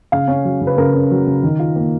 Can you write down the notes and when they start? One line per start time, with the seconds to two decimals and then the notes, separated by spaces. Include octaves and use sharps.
0.12 C#3 F5
0.28 C#4
0.45 F#3
0.61 C#3
0.67 B4
0.78 C#3 A#4
0.93 C#4
1.11 F#3
1.27 C#3
1.43 D#3
1.59 F4
1.76 A#3